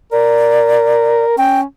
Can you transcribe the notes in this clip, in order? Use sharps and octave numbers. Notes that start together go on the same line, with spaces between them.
A#4 D5
C#4 G5